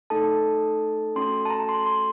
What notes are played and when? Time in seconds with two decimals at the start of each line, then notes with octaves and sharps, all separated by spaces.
0.10 A3 D#4 A4 A5
1.15 A3 C#4 F#4 A4 C6
1.46 A5
1.50 A#5
1.69 C6
1.86 C6